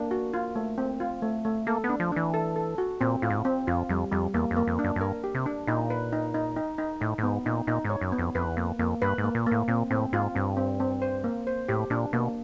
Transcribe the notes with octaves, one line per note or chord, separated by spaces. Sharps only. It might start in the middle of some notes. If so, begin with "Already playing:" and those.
Already playing: A#3 D4
F#4
F4
A3
C4
F4
A3
A3
A#3 A4
B3
D4
F3
E3 D4
A4
A4
F#4
A#2 C4
A2 F4
G#2
A2
C4
F2 F4
F2 G3
F2 G3
E2 A#3
F2
A#3
F2
D4
F#2
F#2
G2 A#4
G4
C3
D4
A#2 D#4
B4
D#4
D#4
D#4
D#4
A2 D#4
A2
G#2 B3
A#2 D#4
A#2 D#4
G#2
C#5
F#2
B3
F2
F2 B4
E2
F2 A#3
F2 A#3
G2 B4
G#2
A#3
A#2
A#3
A2
A#2 C4
A2 C4
G#2 F4
G2 C4
C4
C4
C5
A#3
C5
A2 G4
A#2 D4
B2 A#3